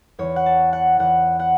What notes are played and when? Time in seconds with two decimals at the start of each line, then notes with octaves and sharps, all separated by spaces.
0.19 E2 E3 C#5
0.36 F#5
0.46 A5
0.73 F#5
0.99 E2 E3 F#5
1.40 F#5